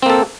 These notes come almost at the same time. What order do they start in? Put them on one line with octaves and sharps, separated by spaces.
C4 A#3 A4